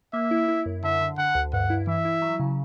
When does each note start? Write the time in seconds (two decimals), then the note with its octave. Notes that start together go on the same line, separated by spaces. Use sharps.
0.13 A#3 E5
0.31 E4
0.48 E4
0.66 F#2
0.83 D3 E5
1.01 D3
1.18 D3 F#5
1.35 D2
1.53 G2 F#5
1.70 E4
1.87 E3 E5
2.05 E4
2.22 F#3
2.40 C#3